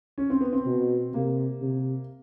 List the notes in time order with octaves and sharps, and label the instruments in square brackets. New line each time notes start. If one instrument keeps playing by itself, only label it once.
[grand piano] C#4
C4
B3
C4
[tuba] B2
[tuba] C3 [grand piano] A#3
[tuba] C3